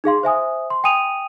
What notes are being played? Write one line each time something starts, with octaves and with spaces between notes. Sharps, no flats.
D#4 G#4 F5 C6
C5 E5 G#5 D#6
C6
G5 G#5 D#6 D#7 F7